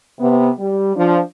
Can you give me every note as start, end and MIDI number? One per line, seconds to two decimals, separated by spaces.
0.20 0.49 48
0.20 0.49 59
0.59 0.91 55
0.96 1.19 53
0.96 1.19 62